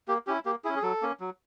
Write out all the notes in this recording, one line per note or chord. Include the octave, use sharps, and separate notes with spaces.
A#3 G4
C#4 E4 G4
A#3 G4
C#4 E4 G#4
G#4
F#3 A4
A#3 C#4
F#3